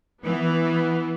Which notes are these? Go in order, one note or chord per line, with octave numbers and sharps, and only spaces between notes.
E3 B3